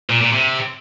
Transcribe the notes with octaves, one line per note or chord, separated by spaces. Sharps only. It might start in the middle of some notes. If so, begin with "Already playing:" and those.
A#2
A#2
C3